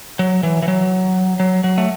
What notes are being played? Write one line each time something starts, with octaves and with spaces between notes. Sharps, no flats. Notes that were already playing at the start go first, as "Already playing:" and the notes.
F#3
E3
E3
F#3
F#3
F#3
A3